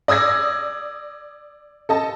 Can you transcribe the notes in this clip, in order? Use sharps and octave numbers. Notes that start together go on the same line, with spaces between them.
D5 D#6 E6 G#6 A#6
A4 D#5 A5